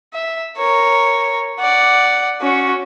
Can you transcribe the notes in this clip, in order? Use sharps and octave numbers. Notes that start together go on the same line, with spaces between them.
E5
A#4 C#5
D5 F#5
C#4 F#4